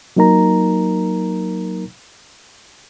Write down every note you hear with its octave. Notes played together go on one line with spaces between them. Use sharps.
F#3 A#3 D#4 A#4 A#5